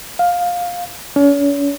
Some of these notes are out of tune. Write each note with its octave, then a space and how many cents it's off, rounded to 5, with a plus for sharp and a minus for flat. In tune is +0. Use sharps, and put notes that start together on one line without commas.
F5 +15
C#4 +40